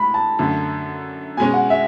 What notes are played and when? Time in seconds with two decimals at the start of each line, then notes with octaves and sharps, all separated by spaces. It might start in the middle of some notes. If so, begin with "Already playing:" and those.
Already playing: A2 G#3 B5
0.14 A5
0.39 F#2 D3 A3
1.37 B2 G#5
1.40 G#3 C#4
1.54 F#5
1.70 E5